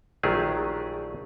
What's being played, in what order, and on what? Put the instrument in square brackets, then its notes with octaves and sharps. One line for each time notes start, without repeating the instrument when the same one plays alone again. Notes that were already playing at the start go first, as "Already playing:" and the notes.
[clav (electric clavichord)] A#1 D#3 F#3 A3 G4 G#4